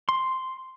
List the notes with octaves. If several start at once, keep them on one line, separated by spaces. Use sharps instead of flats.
C6